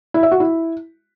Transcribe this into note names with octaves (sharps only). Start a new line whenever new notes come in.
E4
E5
F#4
E4